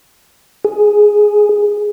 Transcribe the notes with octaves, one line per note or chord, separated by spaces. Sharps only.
G#4